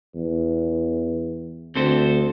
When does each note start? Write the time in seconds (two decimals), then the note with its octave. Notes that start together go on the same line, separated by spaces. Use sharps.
0.15 E2
1.75 D2 C4 A4 C5